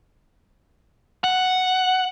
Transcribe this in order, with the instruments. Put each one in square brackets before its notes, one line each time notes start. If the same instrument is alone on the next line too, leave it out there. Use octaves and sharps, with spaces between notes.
[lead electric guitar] F#5